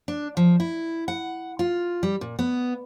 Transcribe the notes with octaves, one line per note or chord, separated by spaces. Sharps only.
D4
F3
E4
F#5
F4
G3
A#2
B3